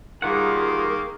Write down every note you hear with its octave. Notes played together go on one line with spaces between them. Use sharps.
D#3 G3 A#3 F4 G#4 A#4 F#5